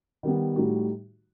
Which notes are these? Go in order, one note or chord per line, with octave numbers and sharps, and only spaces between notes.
D#3 G3 B3
A2 G3 D#4 F#4